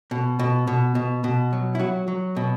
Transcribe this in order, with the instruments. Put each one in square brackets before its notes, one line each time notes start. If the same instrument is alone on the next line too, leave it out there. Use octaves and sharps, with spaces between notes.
[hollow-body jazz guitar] B2
B2
B2
B2
B2
F#3
E4
F#3 F#4
F#3
B2